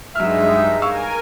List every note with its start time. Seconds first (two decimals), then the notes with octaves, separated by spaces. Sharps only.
0.15 G2 F#3 G#3 D#4 E5 F6
0.82 A#4 F5 G#5 C#6 E6